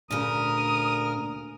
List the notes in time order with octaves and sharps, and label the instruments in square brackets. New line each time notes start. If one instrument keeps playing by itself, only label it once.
[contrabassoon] D2 [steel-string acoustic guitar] A#2 C#3 [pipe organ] A#4 F6 [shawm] D#6